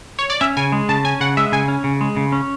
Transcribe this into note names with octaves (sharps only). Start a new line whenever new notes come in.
C#5
D5
C#4 E5
C#3 G#5
G#3
C#3 A5
C#4 G#5
C#3 F#5
G#3 E5
C#3 G#5
C#4
C#3
G#3
C#3
C#4